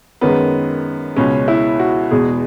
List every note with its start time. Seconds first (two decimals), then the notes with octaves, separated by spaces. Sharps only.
0.21 F#2 D#3 G#3 B3
1.16 C#2 B2 G#3 C#4
1.48 E4
1.79 F#4
2.11 E2 B2 G#3 G#4